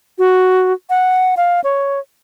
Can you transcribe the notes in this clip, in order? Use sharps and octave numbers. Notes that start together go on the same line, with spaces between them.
F#4
F#5
F5
C#5